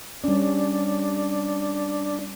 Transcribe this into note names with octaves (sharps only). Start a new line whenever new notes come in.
G3 C#4 D4